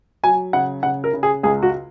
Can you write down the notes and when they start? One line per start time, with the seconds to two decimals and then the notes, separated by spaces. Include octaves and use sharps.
0.23 F#3 G#5
0.53 C#3 F#5
0.83 C#3 F#5
1.04 A#4
1.13 C#3
1.23 G#4
1.43 C#2 G#4
1.63 F#4